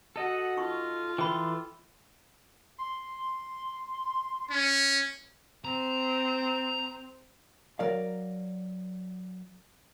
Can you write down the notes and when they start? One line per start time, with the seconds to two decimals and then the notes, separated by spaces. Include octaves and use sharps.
0.16 F#4 A4 D#5 F#5
0.57 D#4 F4 C#6
1.18 E3 A4 G5 B5 C6
2.78 C6
4.51 C#4
5.65 C4 A#5
7.79 F#3 A#4 D5 F5